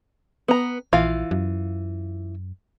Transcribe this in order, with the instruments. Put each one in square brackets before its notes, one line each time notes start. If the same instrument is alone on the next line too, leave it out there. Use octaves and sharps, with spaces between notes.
[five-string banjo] B3 A#5
[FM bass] A#1 [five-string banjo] E3 F4 F5
[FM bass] F#2